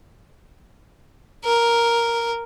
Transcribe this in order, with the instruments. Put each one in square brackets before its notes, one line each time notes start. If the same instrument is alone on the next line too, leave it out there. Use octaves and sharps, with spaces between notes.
[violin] A#4